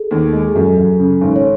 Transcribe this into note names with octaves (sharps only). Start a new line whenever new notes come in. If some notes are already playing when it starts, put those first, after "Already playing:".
Already playing: G#4 A4
D#2
G#3
G#4
F#2 A4
F#2
C#3
G#1
C#5